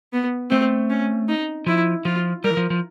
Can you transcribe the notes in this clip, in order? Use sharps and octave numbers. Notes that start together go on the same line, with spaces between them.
B3
A3 C4
C#4
D#4
F3 E4
F3 F4
G3 A#4
E3
F3
F3